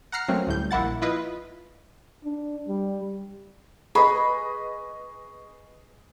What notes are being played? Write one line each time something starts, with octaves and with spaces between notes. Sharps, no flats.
F#5 A#5 F6 C7 C#7
F#3 A3 A#3 C4 C#4
D2 A2 G3 G6
A#1 A#3 E4 F#5 A6
E4 F4 B4 D#5
D4
G3
G#4 B4 D#5 B5 C#6